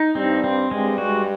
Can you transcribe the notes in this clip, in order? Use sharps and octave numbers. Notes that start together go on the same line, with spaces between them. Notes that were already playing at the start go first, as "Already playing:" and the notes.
Already playing: D#4
G2 G3 C4
C4
G2 G3 G#3
F#4